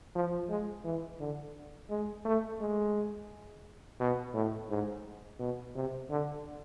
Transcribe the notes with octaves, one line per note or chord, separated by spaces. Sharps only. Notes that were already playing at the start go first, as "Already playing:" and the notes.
F3
G#3
E3
D3
G#3
A3
G#3
B2
A2
G#2
B2
C3
D3